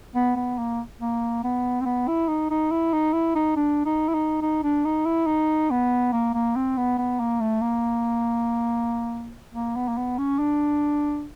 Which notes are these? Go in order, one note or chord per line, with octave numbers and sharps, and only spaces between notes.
B3
B3
A#3
A#3
B3
C4
B3
E4
D#4
D#4
E4
D#4
E4
D#4
D4
D#4
E4
D#4
D#4
D4
D#4
E4
D#4
B3
A#3
A#3
C4
B3
B3
A#3
A3
A#3
A#3
B3
A#3
B3
C#4
D4